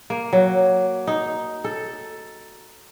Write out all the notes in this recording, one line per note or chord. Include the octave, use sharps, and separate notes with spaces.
A#3
F#3
D#4
A4